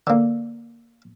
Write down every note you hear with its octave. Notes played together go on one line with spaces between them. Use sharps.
D3 A#3